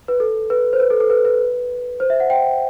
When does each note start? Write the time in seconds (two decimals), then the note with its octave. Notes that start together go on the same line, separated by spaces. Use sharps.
0.08 B4
0.20 A4
0.50 B4
0.73 C5
0.80 B4
0.90 A4
1.00 A4
1.10 B4
1.25 B4
2.00 C5
2.10 E5
2.20 F#5
2.30 G5